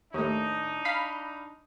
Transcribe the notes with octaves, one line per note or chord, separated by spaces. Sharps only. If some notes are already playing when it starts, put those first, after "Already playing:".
D#2 A2 D4 D#4
F5 B5